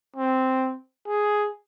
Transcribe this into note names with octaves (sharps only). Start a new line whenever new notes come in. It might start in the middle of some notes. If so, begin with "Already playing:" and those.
C4
G#4